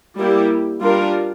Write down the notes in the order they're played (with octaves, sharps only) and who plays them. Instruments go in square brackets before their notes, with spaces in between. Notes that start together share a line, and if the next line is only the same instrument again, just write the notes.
[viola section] G3 A#3 E4 G4
G3 D4 F4 A#4